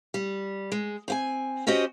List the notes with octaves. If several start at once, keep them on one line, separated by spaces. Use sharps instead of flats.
G3
G#3
C4 F5 G#5
C#4 F#4 G4 C5 D#5